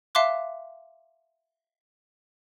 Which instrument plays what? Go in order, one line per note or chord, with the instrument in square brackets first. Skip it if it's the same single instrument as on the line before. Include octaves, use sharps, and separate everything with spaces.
[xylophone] E5 F5 A5 C6 D6 F#6